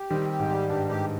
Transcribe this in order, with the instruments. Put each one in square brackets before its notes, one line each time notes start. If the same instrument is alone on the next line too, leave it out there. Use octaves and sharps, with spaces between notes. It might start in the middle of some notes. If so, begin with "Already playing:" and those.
Already playing: [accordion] G4
[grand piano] D#3 G3 [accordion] C4
[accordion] G4
[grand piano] G#2
[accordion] G3
[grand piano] G2 [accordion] G4
[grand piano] G#2 [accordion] G4